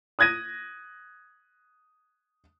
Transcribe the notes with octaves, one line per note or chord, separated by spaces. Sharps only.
D#6 F#6 G#6 A#6 D#7